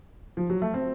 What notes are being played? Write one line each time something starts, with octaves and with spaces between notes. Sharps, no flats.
F3
F#3
A3
C4